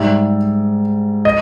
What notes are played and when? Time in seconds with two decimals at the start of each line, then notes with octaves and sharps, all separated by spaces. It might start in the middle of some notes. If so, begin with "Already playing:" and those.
Already playing: G#2 G3 E5
1.25 D#5